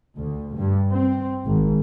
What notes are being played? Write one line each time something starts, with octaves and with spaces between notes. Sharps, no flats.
D2
G2
C4
G#1